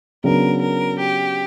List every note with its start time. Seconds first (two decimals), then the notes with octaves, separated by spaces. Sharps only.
0.24 C#3 F#3 B3 D4 A#4
0.61 A#4
0.99 G4